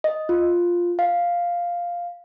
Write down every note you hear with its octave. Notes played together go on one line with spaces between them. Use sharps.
D#5
F4
F5